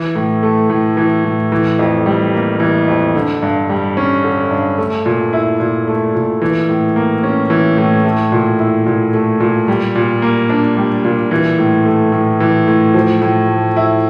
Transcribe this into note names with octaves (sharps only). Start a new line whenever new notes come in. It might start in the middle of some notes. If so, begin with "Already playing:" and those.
Already playing: E3
A2
A3
A2
E3
A2
E3
F2
G3
A#3
E3
F2
D3
G2
G3
C#4
D3
G2
A3
A#2
E4
A#2
A3
A#2
E3
A2
A#3
C#4
E3
A2
A3
A#2
E4
A#2
A3
A#2
G3
A#2
A#3
D4
G3
A#2
E3
A2
A3
A2
E3
A2
F3
A2
A3
E4